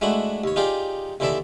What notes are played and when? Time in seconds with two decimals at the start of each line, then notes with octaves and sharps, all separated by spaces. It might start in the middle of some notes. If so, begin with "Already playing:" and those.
0.01 G#3 A3 D4 E4 F#4
0.44 D#2 C#5
0.56 D#4 F4 G4 G#4 D5
1.20 D#2 D3 E3 A4 D5 E5